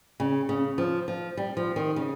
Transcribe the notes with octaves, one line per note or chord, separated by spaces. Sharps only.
C#3
C#3
F3
F3
G3
F3
D#3
C#3